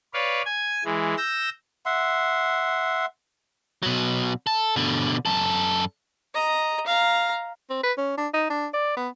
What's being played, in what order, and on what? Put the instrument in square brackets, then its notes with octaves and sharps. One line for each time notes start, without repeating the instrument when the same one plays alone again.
[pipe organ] B4 C#5 D5 F5
G#5 G#6
E3 G#3
E6 G6 A#6
[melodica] E5 F#5 C6
[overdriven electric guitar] B2 F#3
A4
B2 D3
F#2 A4
[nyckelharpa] D#5 A#5
F5 A#5
[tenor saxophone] C4
B4
C#4
D4
D#4
D4
D5
B3